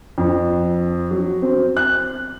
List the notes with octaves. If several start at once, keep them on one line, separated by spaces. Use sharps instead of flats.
F2
F#3
C4
F#6